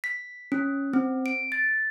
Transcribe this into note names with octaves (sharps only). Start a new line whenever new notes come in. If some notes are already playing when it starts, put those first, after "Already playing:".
B6
C#4
C4
D7
A6